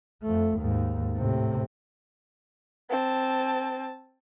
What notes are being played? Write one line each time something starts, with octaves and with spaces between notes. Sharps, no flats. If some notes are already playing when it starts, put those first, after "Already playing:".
F2 A3
D#2 G#2
A2 C3
C4 A5